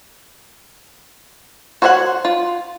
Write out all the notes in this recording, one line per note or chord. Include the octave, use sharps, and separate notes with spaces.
F#4 C5 C#5 E5 F#5
F4